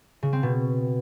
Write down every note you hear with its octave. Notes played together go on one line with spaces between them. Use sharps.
C#3
C4
B2